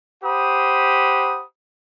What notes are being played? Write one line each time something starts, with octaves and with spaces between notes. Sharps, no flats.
G4 C5 F#5 B5 D#6